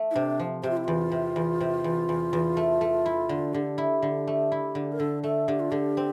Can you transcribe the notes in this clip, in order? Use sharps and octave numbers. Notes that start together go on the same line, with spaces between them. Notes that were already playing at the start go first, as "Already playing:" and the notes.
Already playing: A3
E4
C3 D4
F3
C3 G4
F4
E4
E2 F4
C3
E2
C3
E2
E2
E2
A3
A3
E4
D3
D3 G4
E4
D3
A3
E4
D3
A#4
D3 A4
A3 A4
D3 G4
F4
D3 G4
C4